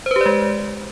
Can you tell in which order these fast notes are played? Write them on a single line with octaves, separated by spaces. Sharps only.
C5 B4 G4 D5 G#3